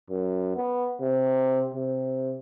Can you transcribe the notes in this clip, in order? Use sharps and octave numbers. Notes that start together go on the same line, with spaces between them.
F#2
B3
C3
C3